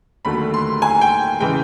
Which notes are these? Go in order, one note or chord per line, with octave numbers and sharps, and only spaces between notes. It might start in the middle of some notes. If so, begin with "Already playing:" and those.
D#2 D3 F#3 A3 B5
C6
G#5
G5
C#3 E3 G#3 G5